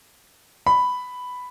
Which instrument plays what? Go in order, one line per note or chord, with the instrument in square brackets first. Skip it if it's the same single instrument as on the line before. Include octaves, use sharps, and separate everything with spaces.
[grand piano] B5